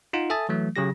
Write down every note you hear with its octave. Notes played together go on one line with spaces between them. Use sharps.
D#4 F4 F#5
A4 E5 G#5 A5 D#6 A6
E3 F#3 A3
C#3 F#3 G4 A#6